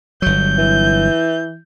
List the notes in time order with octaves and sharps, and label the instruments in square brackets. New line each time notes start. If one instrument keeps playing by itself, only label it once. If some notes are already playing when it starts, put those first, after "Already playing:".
[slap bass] G1 F#3 [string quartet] G6
[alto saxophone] E3